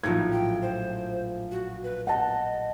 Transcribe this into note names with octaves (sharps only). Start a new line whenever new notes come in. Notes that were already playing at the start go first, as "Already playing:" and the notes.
A#1 A2 F3 F#3 D#4 G#6
G5
C5
F#4
B4
D#5 F#5 A5